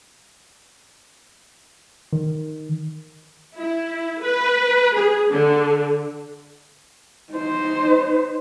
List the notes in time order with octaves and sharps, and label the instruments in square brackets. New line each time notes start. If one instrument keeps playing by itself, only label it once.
[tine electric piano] D#3
[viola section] E4
B4
G#4
D3
[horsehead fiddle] D#4 C5